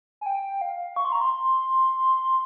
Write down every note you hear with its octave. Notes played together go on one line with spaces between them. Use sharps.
G#5
G5
F5
C#6
C6
A#5
C6